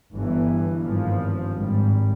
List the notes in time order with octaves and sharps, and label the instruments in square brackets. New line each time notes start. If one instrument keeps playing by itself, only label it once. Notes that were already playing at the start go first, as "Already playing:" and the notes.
[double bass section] G1 G2 E3
G#1 G2 F3
G#1 G#2 G3